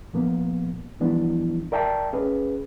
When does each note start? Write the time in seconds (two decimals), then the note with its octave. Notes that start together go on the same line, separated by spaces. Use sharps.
0.13 A#2 F3 A#3 B3
1.00 E3 F3 G3 B3 D4 E4
1.72 A#4 D5 E5 G5 A5
2.13 C#4 G#4 B4